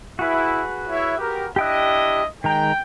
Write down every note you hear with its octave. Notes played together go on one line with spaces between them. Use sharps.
E4 F#4 G#4 B4
E4 C#5 E5
G4 A#4
D4 E4 G4 D#5 G5 F#6
D#3 G#3 G5 A#5